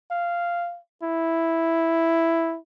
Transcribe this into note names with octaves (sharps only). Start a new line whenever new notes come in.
F5
E4